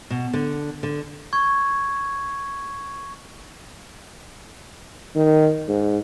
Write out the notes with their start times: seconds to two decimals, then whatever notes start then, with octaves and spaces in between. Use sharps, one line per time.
0.10 B2
0.33 D3
0.83 D3
1.33 C#6 G#6
5.15 D#3
5.68 G#2